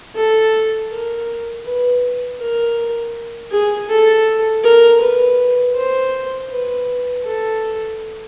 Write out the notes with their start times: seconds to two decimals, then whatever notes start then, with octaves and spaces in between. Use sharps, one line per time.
0.15 A4
0.90 A#4
1.65 B4
2.39 A#4
3.51 G#4
3.89 A4
4.64 A#4
5.00 B4
5.76 C5
6.50 B4
7.25 A4